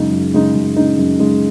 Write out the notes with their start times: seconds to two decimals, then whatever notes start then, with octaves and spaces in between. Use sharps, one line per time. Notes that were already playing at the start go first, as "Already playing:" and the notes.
Already playing: F#2 C#3 G#3 D#4
0.11 F#2
0.33 C#3 G#3 D#4
0.55 F#2
0.76 C#3 G#3 D#4
0.98 F#2
1.19 C#3 G#3 D#4